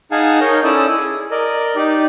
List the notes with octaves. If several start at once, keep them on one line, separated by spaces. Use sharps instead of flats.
D#4 G#4 F5 F#5 G#5 A5
D#4 A#4 C#5 D#5 G6
C#4 E4 A4 D5 D#6 E6
G#4
A#4 D5 D#5
D#4 G4 D5